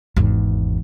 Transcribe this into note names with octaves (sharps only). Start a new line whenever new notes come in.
G#1 E2